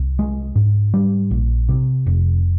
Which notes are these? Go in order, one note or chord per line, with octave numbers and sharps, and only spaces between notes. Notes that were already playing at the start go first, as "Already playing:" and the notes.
Already playing: C2
G#3
G#2
G3
A#1
C3
F1